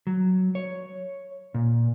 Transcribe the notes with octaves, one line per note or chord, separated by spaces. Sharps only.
F#3
C#5
A#2